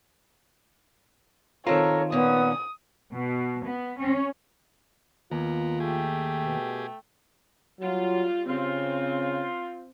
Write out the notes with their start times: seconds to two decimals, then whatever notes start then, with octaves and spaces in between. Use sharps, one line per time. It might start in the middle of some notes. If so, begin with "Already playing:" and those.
1.67 D#3 C4 F4 A4 A#4 C#5
2.12 A#2 B3 C#4 D#6
3.13 B2
3.65 B3
4.00 C#4
5.31 D#2 B3 F4 A#4
5.80 A3 G4 G#4 G5
6.45 B2
7.81 F#3 G3 F4
8.49 C#3 C4 F4